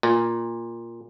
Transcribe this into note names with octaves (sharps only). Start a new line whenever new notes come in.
A#2